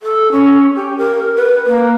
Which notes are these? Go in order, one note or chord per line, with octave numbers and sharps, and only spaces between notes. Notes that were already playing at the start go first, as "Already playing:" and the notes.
A4
C#4
G4
A#4
B4
A#3